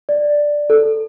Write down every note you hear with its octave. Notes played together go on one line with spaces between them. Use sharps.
D5
A4